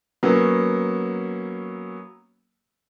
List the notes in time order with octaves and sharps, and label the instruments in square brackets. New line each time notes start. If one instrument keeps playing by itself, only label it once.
[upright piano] F#3 A#3 B3 C#4